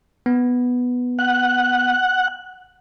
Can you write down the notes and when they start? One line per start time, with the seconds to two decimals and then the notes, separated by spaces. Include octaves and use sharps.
0.26 B3
1.19 F#5 F#6